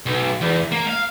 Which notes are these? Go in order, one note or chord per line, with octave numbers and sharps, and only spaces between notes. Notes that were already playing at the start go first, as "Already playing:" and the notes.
B1
E2
A#3
F5